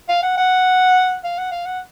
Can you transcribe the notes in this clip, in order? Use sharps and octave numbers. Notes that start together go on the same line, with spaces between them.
F5
F#5
F#5
F5
F#5
F5
F#5